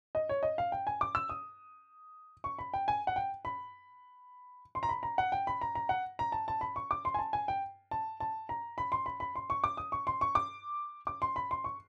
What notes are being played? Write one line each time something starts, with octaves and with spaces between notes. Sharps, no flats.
D#5
C#5
D#5
F5
G5
G#5
D6
E6
D#6
C#6
B5
G5
G#5
F#5
G5
B5
C6
A#5
B5
A#5
F#5
G5
B5
A#5
A#5
F#5
A#5
A5
A5
B5
C#6
D6
C6
G#5
A5
G#5
G5
A5
A5
A#5
B5
C6
B5
B5
C6
C#6
D6
D#6
C#6
C6
C#6
D6
D6
C6
B5
C6
C#6